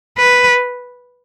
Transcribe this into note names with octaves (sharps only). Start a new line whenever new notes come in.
B4